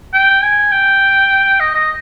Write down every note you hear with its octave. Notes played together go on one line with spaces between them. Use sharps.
G5
G#5
G5
D#5
D#5